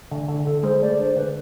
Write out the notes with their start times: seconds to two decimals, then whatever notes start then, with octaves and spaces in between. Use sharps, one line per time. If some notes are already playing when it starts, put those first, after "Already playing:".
0.12 D3
0.28 D3
0.46 D3 A4
0.63 G#3 C5
0.81 A3 D5
0.99 D4 C5
1.16 D3 B4